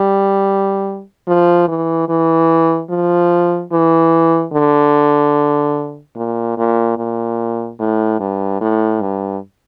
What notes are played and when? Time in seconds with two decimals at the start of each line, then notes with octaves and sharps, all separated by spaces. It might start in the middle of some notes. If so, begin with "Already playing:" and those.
Already playing: G3
1.27 F3
1.68 E3
2.08 E3
2.90 F3
3.72 E3
4.53 D3
6.16 A#2
6.57 A#2
6.98 A#2
7.80 A2
8.20 G2
8.61 A2
9.01 G2